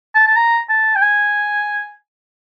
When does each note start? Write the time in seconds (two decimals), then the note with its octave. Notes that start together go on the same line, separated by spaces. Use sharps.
0.15 A5
0.27 A5
0.36 A#5
0.69 A5
0.96 G5
1.02 G#5